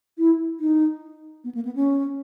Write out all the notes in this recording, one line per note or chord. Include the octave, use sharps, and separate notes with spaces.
E4
D#4
B3
A#3
B3
C#4